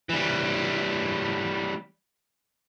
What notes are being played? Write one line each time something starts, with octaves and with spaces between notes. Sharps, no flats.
E3 G3